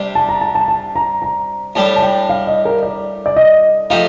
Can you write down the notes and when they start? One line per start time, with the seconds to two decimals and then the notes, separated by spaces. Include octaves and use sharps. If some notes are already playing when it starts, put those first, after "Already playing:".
Already playing: C3 G3 D4
0.15 A5
0.29 A#5
0.41 A5
0.55 A5
0.68 A5
0.96 A#5
1.22 A#5
1.75 A2 G3 D4 A5
1.96 A5
2.02 G5
2.29 F5
2.47 D#5
2.65 A#4
2.83 D5
3.26 D5
3.36 D#5
3.90 F3 A3 D#4 G4 F5